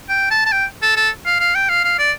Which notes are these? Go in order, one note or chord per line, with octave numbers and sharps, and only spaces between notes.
G5
A5
A5
G5
A4
A4
F5
F5
G5
F5
F5
D5